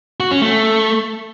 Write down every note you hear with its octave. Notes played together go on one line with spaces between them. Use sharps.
F#4
C#4
A3